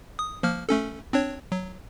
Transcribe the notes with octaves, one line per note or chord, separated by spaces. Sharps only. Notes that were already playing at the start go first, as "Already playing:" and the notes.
D#6
F3 A#3 F6
A3 C#4 A4
C4 D4 C#5
F#3